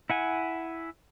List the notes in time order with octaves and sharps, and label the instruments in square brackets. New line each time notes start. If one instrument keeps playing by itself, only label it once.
[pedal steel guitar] E4 F#5 G#5